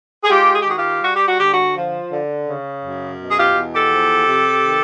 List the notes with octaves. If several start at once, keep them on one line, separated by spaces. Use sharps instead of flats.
G#4
G#3 F4 G4
G#4
G4
D#3 F#4 G#4
F4 G4
G3 F#4
G4
F#4
D3 G4
F#4
F3
D3
C#3
F#2
B2
G#4
F4 G4
E2
G4 A4
F3
C3
D#3